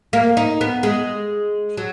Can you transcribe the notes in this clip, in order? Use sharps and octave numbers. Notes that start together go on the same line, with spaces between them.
A#3
D#4
B3
G#3
F#3